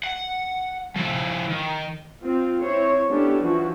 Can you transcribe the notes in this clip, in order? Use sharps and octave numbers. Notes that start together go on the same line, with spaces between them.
F#5
F3 E4
D#3
C4 F4
C4 E4 C5 C#5
A3 B3 C#4 D4 E4 G4
E3 F3 E4 F#4